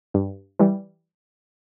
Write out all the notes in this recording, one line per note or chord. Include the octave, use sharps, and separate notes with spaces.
G2
E3 G3